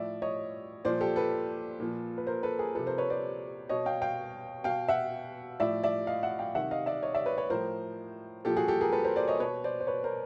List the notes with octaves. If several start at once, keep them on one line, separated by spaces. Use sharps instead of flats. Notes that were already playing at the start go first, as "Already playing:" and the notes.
Already playing: A2 F3 D5 E5
C#5 D#5
A#2 F3 C5 D5
G4 A4
A4 B4
A#2 F3
B4
A#4 C5
A4 B4
G#4 A#4
C3 F3 A4 B4
A#4 C5
B4 C#5
C5 D5
B2 C#5 D#5
F5 G5
F5 G5
B2 F5 G5
E5 F#5
A2 F3 D5 E5
D5 E5
D#5 F5
E5 F#5
F5 G5
C3 D#3 E5 F#5
D#5 F5
D5 E5
C#5 D#5
D5 E5
B4 C#5
B4 C#5
A2 F3 A#4 C5
A#2 F3 G4 A4
F#4 G#4
G4 A4
G#4 A#4
A4 B4
A#4 C5
C5 D5
C#5 D#5
B2 B4 C#5
C5 D5
C5
B4 C#5
A#4 C5